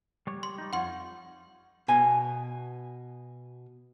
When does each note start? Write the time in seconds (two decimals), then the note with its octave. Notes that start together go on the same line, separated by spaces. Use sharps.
0.27 G3 C#5
0.43 C6
0.58 G3 D#4
0.73 F2 F4 C#5 F#5 C6
1.88 B2 G#5